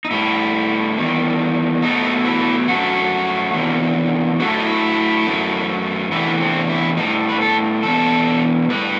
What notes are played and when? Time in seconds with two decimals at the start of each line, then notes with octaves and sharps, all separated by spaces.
0.05 D#4
0.11 A2 G3 E4
0.97 E2 D#3 G3
1.82 B2 F#3 A3 D#4
2.25 E4
2.68 F#2 F#3 A3 F#4
3.54 E2 C3 D#3
4.40 A2 F#3 A3 F#4
4.49 E4
4.58 D#4
4.67 E4
5.27 F#2 F#3 A3
6.11 E2 C3 E3 A3 B3
6.41 C4
6.69 E4
6.97 A2 G3 D#4
7.29 B4
7.41 A4
7.83 E2 B2 G3 A4
8.70 A2 G3 B4